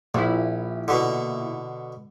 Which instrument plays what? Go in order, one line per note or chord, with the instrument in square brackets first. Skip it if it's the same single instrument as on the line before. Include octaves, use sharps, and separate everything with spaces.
[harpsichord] A#1 [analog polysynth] A#2 E4
[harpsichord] B2 D3